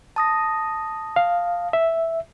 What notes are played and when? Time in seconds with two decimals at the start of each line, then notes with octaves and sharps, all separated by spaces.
0.16 A5 D#6 A#6
1.16 F5
1.73 E5